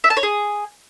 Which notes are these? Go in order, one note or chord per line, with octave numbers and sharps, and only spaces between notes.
E5
A5
C#5
G#4